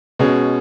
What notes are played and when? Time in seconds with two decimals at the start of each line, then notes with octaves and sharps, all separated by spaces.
0.19 B2 G#3 C#4